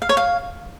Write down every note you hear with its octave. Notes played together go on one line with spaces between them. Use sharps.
F5
C#5
F5